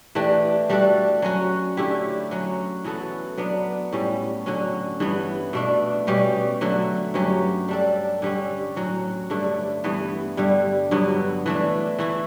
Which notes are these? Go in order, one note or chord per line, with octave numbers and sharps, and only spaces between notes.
E3 A3 D4 G4
G3 D4 F#4 A4
F#3 C#4 F#4
D3 A3 E4 G4
F#3 C#4 F#4
E3 B3 F#4 A4
F#3 B3 D4
A2 G3 C#4
D3 F#3 C#4
G2 E3 B3
B2 A3 D4
B2 G3 C#4 G4
D3 F#3 A3
G2 F#3 C#4 G4
G3 D4 A4
D3 G3 C#4
A2 F#3 C#4 F#4
G2 D3 A3 D4
G2 E3 B3
G2 D3 G3
G2 D3 F#3 B3
E3 A3 D4
E3 A3 E4